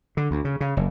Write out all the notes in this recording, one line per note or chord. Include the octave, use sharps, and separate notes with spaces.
D3
D2
C#3
C#3
F#1